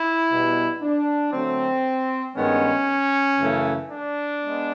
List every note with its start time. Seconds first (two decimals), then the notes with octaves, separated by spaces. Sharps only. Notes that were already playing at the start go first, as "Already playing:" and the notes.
Already playing: E4
0.30 B2 G3 B3
0.82 D4
1.33 D3 F#3 A3 C4
2.35 G2 D#3 G#3 B3 C#4
3.38 F#2 C#3 E3 A3
3.90 D4
4.41 G#3 B3